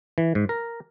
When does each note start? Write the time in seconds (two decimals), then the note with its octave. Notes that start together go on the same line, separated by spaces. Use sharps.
0.18 E3
0.35 G#2
0.49 A#4